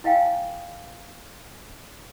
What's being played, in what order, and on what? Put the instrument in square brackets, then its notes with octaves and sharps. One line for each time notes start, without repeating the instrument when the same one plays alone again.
[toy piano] E4 D#5 F5 G5 G#5